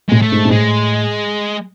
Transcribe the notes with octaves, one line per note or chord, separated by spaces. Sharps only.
A2 G#3
A3
G#2
G#2
A2 G#3